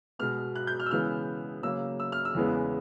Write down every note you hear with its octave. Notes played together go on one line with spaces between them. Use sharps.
B2 G#3 B3 F6
F#6
G6
F6
E6
C#3 E3 G#3 B3 F6
C#3 F#3 A#3 E6
E6
F6
E6
E2 C#3 E3 G#3 B3